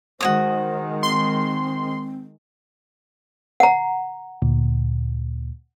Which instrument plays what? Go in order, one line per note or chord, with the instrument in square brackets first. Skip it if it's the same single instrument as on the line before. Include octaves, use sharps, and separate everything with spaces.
[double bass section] D#3 G#3 [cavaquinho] F#4 C#5 D#6 [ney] C5
[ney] C4 [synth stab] C6
[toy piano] F#5 A#5
[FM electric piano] D2 A#2